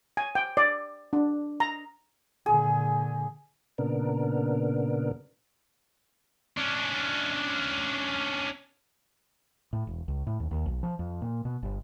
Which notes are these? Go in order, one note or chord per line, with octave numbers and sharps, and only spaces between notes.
G#5
G5
D5
D4
A#5
A#2 D3 G#4
A#2 C#3 B3 D4 A#4
C#4 D4
A2
E1
C#2
A2
D#2
D#2
B1
F3
F2
A#2
B2
G1